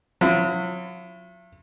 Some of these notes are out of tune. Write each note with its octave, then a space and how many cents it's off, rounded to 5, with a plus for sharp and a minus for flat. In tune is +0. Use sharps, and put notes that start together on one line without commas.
F#3 -40 E4 +40